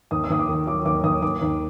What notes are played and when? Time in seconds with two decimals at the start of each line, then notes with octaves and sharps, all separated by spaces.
0.11 D#2 D#6
0.24 E6
0.30 D#2 D#6
0.39 D6
0.48 D#3
0.67 F#3 D6
0.85 D#2 D6
1.04 D#2 D#6
1.22 D#2 D6
1.42 D#2